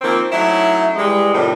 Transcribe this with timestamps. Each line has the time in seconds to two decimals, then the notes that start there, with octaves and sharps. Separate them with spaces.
0.01 D#3 F3 A#3 C4
0.31 F#3 A3 C#4 D#4 E4
0.96 E3 G3 G#3
1.32 F2 A2 C3 D#3 G3